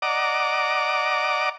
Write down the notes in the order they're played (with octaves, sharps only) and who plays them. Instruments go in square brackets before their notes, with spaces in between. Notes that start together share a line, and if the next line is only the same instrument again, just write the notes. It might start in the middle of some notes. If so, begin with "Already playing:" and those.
[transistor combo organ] D5 D#5 F#5 A#5 D6